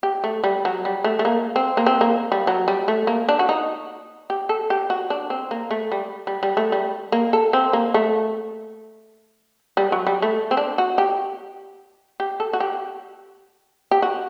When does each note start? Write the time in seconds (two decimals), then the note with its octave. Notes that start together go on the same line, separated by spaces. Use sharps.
0.03 G4
0.24 A3
0.44 G3
0.65 F#3
0.85 G3
1.04 A3
1.19 A3
1.25 A#3
1.56 C4
1.77 A#3
1.86 C4
2.01 A#3
2.32 G3
2.47 F#3
2.68 G3
2.88 A3
3.07 A#3
3.29 D4
3.39 F#4
3.49 D#4
4.30 G4
4.49 A4
4.70 G4
4.90 F#4
5.10 D4
5.30 C4
5.51 A#3
5.71 A3
5.92 G3
6.27 G3
6.43 G3
6.57 A3
6.72 G3
7.12 A#3
7.33 A4
7.53 C4
7.73 A#3
7.94 A3
9.77 G3
9.92 F#3
10.07 G3
10.22 A3
10.51 C4
10.57 D4
10.78 F#4
10.98 G4
12.20 G4
12.40 A4
12.53 F#4
12.60 G4
13.91 G4
14.02 F#4